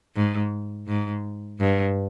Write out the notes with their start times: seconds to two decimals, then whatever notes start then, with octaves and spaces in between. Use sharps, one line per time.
0.16 G#2
0.88 G#2
1.60 G2